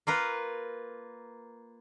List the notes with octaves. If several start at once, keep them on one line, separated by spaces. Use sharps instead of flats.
A#3 F4 A#4 B4